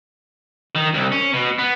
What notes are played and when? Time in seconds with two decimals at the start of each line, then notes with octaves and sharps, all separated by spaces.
0.76 D#3
0.94 C2
1.12 C#4
1.34 B2
1.59 B3